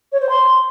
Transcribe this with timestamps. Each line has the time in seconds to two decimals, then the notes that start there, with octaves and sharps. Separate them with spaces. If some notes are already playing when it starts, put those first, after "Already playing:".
0.12 C#5
0.20 C5
0.29 C6